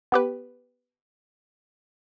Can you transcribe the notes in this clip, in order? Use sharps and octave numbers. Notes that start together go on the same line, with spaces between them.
B3 G4 B4